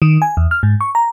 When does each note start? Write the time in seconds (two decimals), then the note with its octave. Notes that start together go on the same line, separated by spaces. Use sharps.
0.02 D#3
0.22 G#5
0.37 E2
0.51 F6
0.63 G#2
0.81 C#6
0.95 A#5